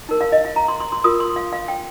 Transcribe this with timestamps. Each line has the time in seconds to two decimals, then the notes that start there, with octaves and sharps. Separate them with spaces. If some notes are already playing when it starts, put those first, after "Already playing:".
0.09 D#4 A#4
0.21 F5
0.32 D#5
0.45 F5
0.56 A#5
0.68 C6
0.80 C6
0.92 C6
1.04 F4 A#4 D#6
1.20 C6
1.36 F5
1.53 F5
1.68 G5